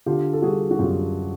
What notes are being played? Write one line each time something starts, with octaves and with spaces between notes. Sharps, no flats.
D3 F4 G4
A4
G3 F#4 G#4
F#4
F#2 F4 G4